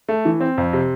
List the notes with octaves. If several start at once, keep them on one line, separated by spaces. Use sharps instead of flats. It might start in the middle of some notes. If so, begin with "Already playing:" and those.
A3
E3
C4
F2
C3